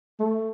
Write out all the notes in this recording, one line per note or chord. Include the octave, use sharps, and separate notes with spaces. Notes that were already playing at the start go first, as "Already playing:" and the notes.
A3